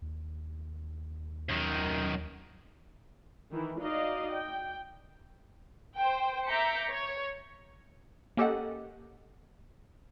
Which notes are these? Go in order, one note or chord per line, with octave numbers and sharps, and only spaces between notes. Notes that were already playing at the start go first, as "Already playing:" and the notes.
D#2
F#2 D#3
D#3 E3 E4
D#4 F#4 D5 D#5 F5
G5
C5 G5
E5 A#5 D6 G6 B6 C#7
C#5
A#3 C#4 G4 A4 D#5 F#5